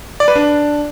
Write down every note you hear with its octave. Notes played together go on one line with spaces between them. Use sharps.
D5
B4
D4